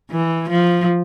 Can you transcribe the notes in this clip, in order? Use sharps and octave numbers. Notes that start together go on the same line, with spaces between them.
E3
F3